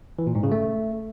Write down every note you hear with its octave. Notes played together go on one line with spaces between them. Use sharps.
E3
A#2
G#2
C#3
A3